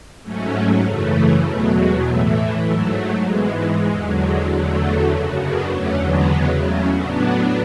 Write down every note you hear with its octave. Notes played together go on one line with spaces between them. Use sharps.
G#2 F#3 A3 C#4
F#2 C#3 E3 A3
E2 B2 F#3 A3
G#3
A2 E3 A3
G#2 F#3 A3
G#2 E3 G#3 B3
G#3
E2 D3 F#3
G#3
E2 D3 F#3 A3
F#2 C#3 F#3
B3 D4
E2 D3 F#3 A3 C#4
G#3 B3
E2 C#3 F#3
A3 C#4
A2 F#3 B3 D4